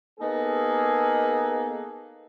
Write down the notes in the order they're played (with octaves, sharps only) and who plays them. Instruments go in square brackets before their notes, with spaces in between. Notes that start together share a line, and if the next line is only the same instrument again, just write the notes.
[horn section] A#3 B3 D#4 G#4 A4